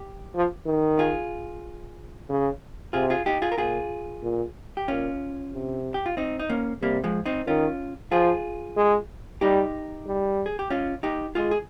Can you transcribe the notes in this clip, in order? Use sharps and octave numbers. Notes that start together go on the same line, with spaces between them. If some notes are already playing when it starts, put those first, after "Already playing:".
Already playing: G4
F3
D#3
F4 G#4
C#3
C3 F4 G#4
F4 G#4
D#4 G4
F4 G#4
A#4
A#2 F4 G#4
A#2
G4
A#2 C#4 F4
C3
G4
F4
C4 D#4
D#4
A#3 C#4
C3 G3 A#3
F3 G#3
C4 D#4
D#3 C#4 F4
F3 F4 G#4
G#3
G3 D#4 G4
G3
G#4
G4
C#4 F4
D#4 G4
G#3 F4 G#4
G#4